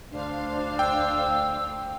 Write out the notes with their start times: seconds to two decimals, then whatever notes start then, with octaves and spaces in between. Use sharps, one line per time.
0.11 D2 D4 C5 F5
0.79 G5 E6